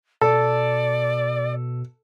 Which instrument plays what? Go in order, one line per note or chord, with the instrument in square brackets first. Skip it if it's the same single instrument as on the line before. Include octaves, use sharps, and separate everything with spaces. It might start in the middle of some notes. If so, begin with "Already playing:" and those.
[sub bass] B2 [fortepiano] A4 [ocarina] D5